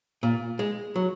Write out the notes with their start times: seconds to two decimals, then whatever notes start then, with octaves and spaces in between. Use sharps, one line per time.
0.23 A#2
0.59 G#3
0.96 F#3